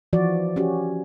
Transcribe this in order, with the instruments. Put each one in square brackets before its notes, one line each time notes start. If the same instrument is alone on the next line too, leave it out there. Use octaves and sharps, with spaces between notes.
[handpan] E3 F3 F#4 D5
C#4 F#4 G4